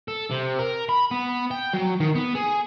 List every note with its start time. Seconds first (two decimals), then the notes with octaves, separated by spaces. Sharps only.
0.08 A4
0.31 C3
0.59 A#4
0.89 B5
1.11 B3
1.51 G5
1.73 F#3
2.00 D#3
2.15 B3
2.35 G#4